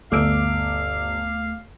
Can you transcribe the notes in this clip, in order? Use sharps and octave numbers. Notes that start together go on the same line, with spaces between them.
G1 D2 A3 F5 D6 E6 D7